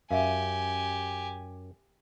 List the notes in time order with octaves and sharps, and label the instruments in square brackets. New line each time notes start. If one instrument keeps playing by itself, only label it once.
[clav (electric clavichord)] F#2 [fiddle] G4 G#5 [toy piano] E5 F5